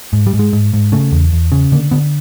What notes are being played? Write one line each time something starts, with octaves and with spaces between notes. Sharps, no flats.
G#2
G3
G#2
G#3
G#2
G#2
C#3 A3
E2
E2
C#3
D3 A#3
D3 B3